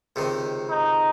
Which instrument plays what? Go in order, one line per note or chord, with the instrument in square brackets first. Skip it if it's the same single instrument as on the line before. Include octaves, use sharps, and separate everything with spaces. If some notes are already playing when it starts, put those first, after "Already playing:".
[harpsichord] C#2 C3 D#3
[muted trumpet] D#4